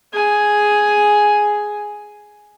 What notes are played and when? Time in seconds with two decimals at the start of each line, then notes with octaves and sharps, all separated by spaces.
0.13 G#4 G#5